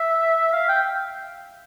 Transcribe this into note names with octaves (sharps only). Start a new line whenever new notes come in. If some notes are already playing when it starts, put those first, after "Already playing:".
Already playing: E5
F5
G5